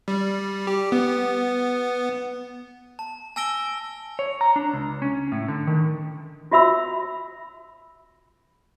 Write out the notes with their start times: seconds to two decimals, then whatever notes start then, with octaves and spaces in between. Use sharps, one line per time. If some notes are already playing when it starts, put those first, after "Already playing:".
0.08 G3
0.67 G4
0.92 B3
2.99 A5
3.36 G#5 A5 E6 A#6 D7 G7
4.19 C#5
4.41 A#5
4.56 D4
4.73 C#2
5.02 C#4
5.32 A2
5.48 D3
5.67 D#3
6.51 F4 F#4 E5 B5 E6